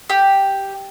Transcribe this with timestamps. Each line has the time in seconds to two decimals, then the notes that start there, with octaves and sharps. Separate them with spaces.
0.09 G4